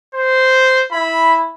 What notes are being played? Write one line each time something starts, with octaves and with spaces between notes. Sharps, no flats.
C5
E4 B5